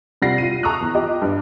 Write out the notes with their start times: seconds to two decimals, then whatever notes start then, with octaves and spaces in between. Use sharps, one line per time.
0.22 C3 G3 F4 F#5 A#6 C7
0.38 F4 D#7
0.63 A5 A#5 C#6 D#6 E6 F#6
0.81 E2
0.94 F4 G4 D#5 D6
1.22 G2